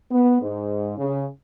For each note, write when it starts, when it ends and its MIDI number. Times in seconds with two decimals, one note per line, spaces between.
0.12 0.39 59
0.42 0.93 44
0.97 1.25 49